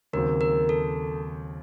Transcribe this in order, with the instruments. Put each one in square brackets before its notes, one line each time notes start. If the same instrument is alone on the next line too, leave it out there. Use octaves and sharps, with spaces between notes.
[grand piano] D#2 C#3 F#3 C4 [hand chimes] A#4
[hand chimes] A#4
A4